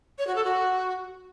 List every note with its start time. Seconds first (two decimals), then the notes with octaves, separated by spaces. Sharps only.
0.18 C#5
0.27 F#4
0.36 A4
0.44 F#4